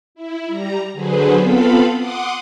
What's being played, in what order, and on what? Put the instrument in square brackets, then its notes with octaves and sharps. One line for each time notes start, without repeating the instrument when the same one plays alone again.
[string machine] E4
G3 A#5
D3 F#3 G#4 B4 C5
B3 C4 F4 A4 F5 B5
F#5 C6 D6 D#6